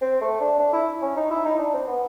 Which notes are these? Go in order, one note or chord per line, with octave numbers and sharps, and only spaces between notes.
C4
A3
D4
D4
E4
C#4
D#4
E4
D#4
D4
C4
B3